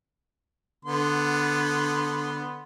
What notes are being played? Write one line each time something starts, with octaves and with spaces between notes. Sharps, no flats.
D3 B3 C6